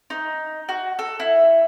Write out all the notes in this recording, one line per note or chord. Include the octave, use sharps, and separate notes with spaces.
D#4
F#4
A4
E4